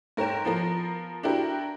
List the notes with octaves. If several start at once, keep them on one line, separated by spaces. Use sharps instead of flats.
G#2 A#4 C#5 G5 E7
F3 B3 F4 A#4
D4 E4 F#4 G4 A#4